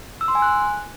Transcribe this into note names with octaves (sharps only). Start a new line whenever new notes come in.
E6
C6
G#5
F#6